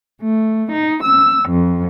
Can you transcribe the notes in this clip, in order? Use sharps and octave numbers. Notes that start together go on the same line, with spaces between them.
A3
D#4
E6
F2